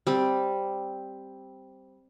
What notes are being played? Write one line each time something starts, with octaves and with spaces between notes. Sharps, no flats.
G3 C4